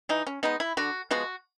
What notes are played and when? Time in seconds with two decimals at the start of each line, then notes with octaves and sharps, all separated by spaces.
0.09 E3 D#4
0.27 C#4
0.43 G#3 B3 D#4
0.60 E4
0.77 D3 F#4
1.11 F3 G#3 B3 F#4